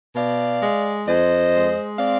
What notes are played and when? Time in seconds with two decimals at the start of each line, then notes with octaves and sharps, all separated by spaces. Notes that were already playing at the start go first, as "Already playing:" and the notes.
0.15 B2 D5 F5
0.61 G#3
1.07 F2 C5 D#5
1.54 G#3
1.99 C4 D5 F5